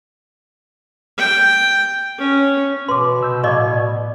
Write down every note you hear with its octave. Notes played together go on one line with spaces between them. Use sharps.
G5
C#4
B2 B4 C6 D6
C3 E6 G6
A2 D#5 F5 C#6 D6 G#6
D5